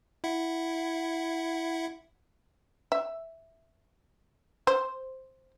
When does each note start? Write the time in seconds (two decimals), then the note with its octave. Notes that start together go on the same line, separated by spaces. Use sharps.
0.24 E4 E5 F#5
2.92 E5
4.67 C5